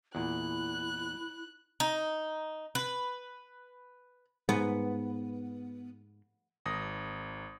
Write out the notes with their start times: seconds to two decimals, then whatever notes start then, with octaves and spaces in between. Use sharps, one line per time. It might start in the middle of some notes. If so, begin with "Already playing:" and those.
0.15 E2 A#2 E4 F#6
1.80 D#4
2.75 B4
4.49 G#2 B3
6.66 G#1 D#6 A#6